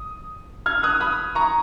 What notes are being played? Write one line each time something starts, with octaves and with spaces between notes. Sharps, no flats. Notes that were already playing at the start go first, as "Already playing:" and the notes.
Already playing: D#6
F6 G#6
D#6 F#6
B5 D#6
A#5 C#6